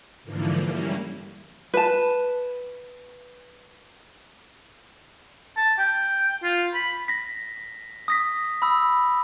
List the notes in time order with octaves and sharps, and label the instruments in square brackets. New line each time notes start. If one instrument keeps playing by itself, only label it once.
[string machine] G#2 D3 E3 F3 A#3
G3 A#3 C#4 E4
[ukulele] B4 A5
[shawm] A5
G5
F4
B5
[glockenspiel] A#6 B6
D#6 A#6 B6
B5 D#6 E6